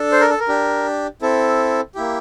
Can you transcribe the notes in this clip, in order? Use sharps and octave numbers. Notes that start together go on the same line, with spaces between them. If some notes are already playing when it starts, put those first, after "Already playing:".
Already playing: D4 A4
C5
A#4
A4
A#4
D4 G4
C4 E4 A4
A#3 E4 G4